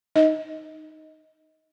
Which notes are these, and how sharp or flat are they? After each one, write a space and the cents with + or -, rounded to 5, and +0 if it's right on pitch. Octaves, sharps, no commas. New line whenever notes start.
D#4 +0 D#5 +20